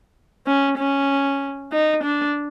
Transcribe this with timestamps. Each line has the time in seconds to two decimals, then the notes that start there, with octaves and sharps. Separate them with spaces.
0.47 C#4
0.78 C#4
1.72 D#4
2.03 D4